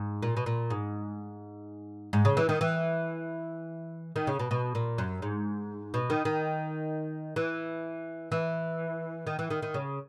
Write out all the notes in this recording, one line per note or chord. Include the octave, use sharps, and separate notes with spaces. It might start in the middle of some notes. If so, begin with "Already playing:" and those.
Already playing: G#2
A#2
B2
A#2
G#2
G#2
C#3
E3
D#3
E3
D#3
C#3
B2
B2
A#2
F#2
G#2
B2
D#3
D#3
E3
E3
D#3
E3
D#3
D#3
C#3